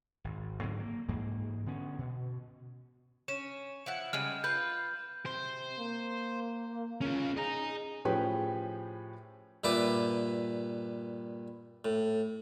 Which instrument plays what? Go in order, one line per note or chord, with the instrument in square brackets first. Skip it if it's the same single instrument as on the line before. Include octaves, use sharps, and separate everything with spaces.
[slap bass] G#1
G#2 D3 F#3 C4
A#3
G#2 E3 G#3 A#3
D3 B3 C#4
B2
[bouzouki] C#4 [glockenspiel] E7
[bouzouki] F3 E4 F#5
[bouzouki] C#3 G3 G#3 [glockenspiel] F6
[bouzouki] F4 B4 [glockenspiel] G6
[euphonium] C3 [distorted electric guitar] C5
[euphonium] A#3
[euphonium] C#3 [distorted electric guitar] C#4 F4
[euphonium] G#4 [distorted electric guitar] D#5 A#5
[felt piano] A2 F3 C#4 G4 G#4 B4
[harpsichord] G2 A#2 B4 E5 D6
A2